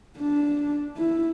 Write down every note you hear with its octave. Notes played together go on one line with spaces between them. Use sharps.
D4
E4